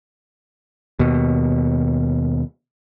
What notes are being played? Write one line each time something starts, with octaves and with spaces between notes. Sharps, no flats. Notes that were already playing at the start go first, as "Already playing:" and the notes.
D#2 B2